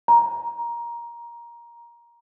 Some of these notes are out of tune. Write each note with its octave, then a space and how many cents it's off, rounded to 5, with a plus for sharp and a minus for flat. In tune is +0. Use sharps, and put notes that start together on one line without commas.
A#5 +15